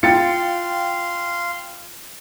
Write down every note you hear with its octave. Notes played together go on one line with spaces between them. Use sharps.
F4 F5 G5 C6 A6 C#7